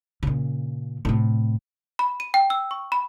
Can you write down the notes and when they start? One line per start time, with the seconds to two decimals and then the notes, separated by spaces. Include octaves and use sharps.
0.23 A#2 C#3
1.05 A2 C3
1.99 B5
2.20 D#7
2.34 G5
2.50 E6
2.71 C#6
2.92 B5